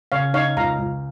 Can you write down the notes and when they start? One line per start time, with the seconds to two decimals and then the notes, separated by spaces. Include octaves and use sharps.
0.12 C#3 C#5 F5
0.34 D#4 C#5 F5
0.57 C#2 F5 A#5
0.79 C#2